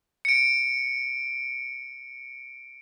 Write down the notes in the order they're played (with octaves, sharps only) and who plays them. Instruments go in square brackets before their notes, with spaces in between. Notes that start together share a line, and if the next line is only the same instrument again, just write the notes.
[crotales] C#7 D7